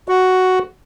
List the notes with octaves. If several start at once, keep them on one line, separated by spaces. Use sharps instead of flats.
F#4